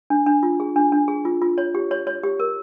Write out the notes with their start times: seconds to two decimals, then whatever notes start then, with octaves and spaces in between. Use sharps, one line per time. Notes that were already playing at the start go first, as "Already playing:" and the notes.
0.10 D4
0.27 D4
0.43 F4
0.60 G#4
0.76 D4
0.92 D4
1.08 G#4
1.25 F4
1.42 F4
1.58 C#5
1.75 G4
1.91 C#5
2.07 C#5
2.23 G4
2.40 A#4